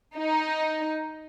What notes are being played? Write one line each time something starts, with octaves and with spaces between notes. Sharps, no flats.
D#4